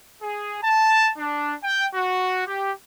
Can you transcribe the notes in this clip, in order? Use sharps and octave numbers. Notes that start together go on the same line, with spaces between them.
G#4
A5
D4
G5
F#4
G4